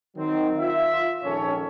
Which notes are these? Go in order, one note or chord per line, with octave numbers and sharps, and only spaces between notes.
D#3 F#3 C4
F4 E5
A#1 G#2 D#3 C#4 A4 C#5